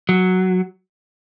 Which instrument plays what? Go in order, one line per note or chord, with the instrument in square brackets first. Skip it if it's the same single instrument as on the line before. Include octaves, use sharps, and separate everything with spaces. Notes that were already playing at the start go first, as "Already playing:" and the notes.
[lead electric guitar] F#3